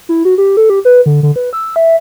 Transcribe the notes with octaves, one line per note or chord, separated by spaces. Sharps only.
E4
F#4
G4
A4
G4
B4
D3
D3
B4
E6
E5